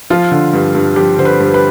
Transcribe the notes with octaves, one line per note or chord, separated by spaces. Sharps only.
F3 F4
D3
G2
G2
F3 G4
D3 C5
B4
G2
B4